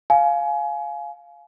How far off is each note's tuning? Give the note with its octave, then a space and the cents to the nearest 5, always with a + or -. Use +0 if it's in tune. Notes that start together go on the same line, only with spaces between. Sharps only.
F5 +0 G#5 +25